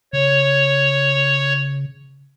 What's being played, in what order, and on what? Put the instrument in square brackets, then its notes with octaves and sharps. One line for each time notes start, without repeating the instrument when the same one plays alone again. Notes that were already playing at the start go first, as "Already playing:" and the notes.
[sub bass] C#3 [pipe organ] C#5